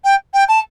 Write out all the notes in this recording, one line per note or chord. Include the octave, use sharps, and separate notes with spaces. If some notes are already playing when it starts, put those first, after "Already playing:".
G5
G5
A5